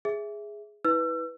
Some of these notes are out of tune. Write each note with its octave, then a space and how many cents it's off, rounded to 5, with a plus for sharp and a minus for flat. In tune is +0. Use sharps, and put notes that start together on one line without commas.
G#4 +0 E5 +0
E4 -30 B4 +0 E6 +35